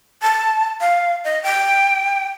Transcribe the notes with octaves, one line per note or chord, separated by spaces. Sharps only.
A5
F5
D#5
G5